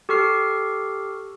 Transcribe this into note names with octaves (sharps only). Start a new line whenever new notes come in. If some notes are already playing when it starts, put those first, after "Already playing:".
G4 A4 C#6 F6 C7